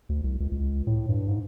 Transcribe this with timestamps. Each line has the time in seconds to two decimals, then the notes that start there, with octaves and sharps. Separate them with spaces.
0.09 D2
0.24 C2
0.40 C#2
0.51 C#2
0.87 A2
1.09 G2
1.28 G#2